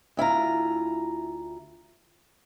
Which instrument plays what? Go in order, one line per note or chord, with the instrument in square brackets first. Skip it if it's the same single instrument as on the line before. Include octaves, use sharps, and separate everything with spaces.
[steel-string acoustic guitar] D2 E4 F4 A#5